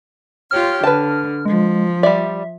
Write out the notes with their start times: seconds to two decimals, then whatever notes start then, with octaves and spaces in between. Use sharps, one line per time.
0.51 F4 G4 C#5 F6
0.83 D3 B4 A5
1.46 F3 G#3
2.03 G3 D5 E5